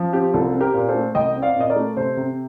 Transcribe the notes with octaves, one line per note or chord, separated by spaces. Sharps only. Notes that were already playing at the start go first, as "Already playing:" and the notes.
Already playing: F3
C4 G4
C2 F4 A4
C4
G4 A#4
A#2
A#4
A4 C5
A3
C2 D#5 G5
C4
D5 F5
A#2 D#5
A#4 D5
A3
C3 A4 C5
C3